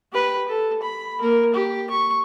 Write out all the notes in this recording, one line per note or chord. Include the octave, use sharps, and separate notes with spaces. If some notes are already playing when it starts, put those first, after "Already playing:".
G4 B4
A4
B5
A#3 A#4
G4
C#6